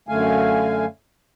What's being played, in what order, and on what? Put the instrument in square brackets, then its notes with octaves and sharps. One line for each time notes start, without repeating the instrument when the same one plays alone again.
[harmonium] F#2 D3 A3 F5 G#5